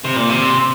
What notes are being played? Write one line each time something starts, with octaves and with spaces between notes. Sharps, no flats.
C3
A#2
C3